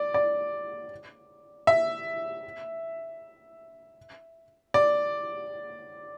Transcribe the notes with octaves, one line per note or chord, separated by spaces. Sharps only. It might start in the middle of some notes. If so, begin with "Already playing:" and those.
Already playing: D5
D5
E5
D5